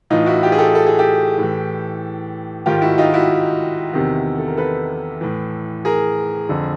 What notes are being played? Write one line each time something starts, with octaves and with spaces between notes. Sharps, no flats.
A2 E3 D#4 F4
E4 F#4
F4 G4
G#4
G4 A4
A4
G#4
G4 A4
A2 E3
G#2 D#3 F4 G4
E4 F#4
D#4 F4
E4 F#4
E2 C3 D#3
A4
A#4
A4 B4
A2 E3
G#4 A#4
F2 D3